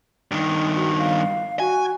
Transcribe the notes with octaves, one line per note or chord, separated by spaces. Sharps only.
G2 D#3
F#4
F5
F#4 G#5